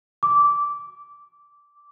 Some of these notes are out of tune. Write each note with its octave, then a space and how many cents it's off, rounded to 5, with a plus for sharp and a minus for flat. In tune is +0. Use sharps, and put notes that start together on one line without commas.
D6 -15